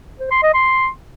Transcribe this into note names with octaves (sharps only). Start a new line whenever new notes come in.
C5
C6
D#5
C6